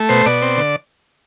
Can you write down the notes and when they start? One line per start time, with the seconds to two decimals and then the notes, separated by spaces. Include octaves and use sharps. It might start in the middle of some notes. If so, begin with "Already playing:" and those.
Already playing: A3
0.09 B2 C5
0.26 B2 D5
0.42 C4
0.57 D3